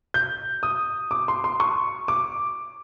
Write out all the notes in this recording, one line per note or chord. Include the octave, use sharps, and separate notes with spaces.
G6
D#6
D6
C6
C6
C#6
D6